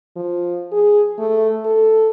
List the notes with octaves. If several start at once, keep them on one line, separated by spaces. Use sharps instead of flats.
F3
G#4
A3
A4